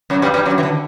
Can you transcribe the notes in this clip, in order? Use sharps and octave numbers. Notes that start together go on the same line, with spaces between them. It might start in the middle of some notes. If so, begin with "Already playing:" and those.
F#2 F#3
G2 G3
G2 G3
F#2 F#3
E3
D3